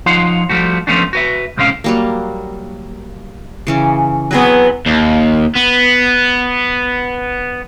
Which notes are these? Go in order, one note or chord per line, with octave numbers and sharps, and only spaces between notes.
F3 D#4 F4 C#5 F#5 C6
F3 G3 A3 F#4
F3 G#3 A3 B3 C#4 D4
F#4 B4 E5
C2 A2 G#3 C4 C#4 F5
F#3 G3 A#3
C#3 E3 C#4
F#3 B3 C4 G#4 B4
D#2
B3